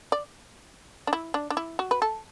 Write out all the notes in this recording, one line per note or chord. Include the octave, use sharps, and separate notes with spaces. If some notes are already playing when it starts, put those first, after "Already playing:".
D5
D4
E4
D4
D4
E4
F#4
B4
A4